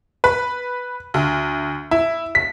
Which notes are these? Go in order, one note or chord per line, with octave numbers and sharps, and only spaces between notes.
B4
D2
E4
B6